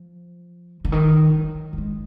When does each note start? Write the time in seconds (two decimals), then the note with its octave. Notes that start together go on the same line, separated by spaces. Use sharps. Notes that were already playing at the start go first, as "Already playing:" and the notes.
Already playing: F3
0.85 D3
0.92 D#3
1.35 F#3
1.73 F#3
1.78 G#3